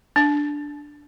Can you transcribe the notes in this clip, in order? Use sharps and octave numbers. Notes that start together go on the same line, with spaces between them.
D4